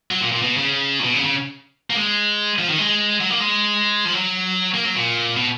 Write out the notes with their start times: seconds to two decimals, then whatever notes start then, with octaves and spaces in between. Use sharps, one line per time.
0.11 F#3
0.21 A#2
0.32 A#2
0.42 B2
0.57 C#3
0.99 A#2
1.04 B2
1.14 C#3
1.24 C#3
1.90 A#3
1.96 G#3
2.58 F3
2.69 D#3
2.78 G#3
3.20 F#3
3.30 A#3
3.40 G#3
4.05 F3
4.13 F#3
4.74 A#3
4.84 F#3
4.95 A#2
5.36 B2